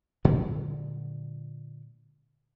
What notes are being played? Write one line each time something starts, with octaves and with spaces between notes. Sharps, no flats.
A#2 D3 F#3 G#3